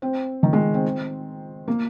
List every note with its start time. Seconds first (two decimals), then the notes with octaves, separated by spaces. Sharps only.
0.02 C4
0.43 D#3
0.53 G#3
0.74 C4
1.68 A#3